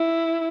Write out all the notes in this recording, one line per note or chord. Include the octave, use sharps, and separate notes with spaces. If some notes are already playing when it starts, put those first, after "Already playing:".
Already playing: E4